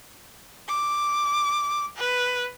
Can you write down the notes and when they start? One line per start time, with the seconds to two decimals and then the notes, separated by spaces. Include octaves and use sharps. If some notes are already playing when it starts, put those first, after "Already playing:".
0.68 D6
1.97 B4